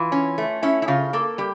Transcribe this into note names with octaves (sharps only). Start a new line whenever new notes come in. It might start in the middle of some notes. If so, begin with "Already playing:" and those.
Already playing: E3 F4
C#4
A3
C#4 E4
E4
C#3 F4
A#3 A4
G3 G4